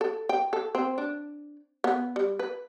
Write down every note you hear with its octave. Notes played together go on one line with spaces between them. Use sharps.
A4
G5
A4
C4
D4
B3
G3
B4